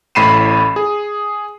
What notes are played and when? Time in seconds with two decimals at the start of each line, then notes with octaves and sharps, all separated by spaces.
0.15 A1 A2 B5 C7 D#7 E7
0.76 G#4